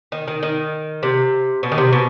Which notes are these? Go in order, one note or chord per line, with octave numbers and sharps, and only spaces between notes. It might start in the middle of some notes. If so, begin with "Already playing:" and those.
D#3
D#3
D#3
C3
B2
D#3
C3
B2